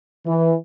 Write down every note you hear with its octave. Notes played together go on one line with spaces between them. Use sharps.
E3